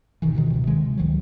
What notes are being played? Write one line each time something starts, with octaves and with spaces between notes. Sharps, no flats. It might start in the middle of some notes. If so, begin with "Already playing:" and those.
A1 B2 D#3 E3
B2 D3 D#3 F3
D2 B2
C3 D#3 G#3
D2 D#3 F3 F#3